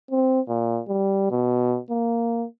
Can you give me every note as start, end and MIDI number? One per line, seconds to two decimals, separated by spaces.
0.11 0.40 60
0.48 0.80 46
0.88 1.29 55
1.31 1.79 47
1.90 2.45 58